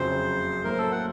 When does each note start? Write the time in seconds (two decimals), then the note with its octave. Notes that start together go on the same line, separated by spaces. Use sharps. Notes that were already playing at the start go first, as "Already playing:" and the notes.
Already playing: F#1 F2 C#3 F#3 C5
0.64 A2 F#3 A#3 A#4
0.78 A4
0.92 F#5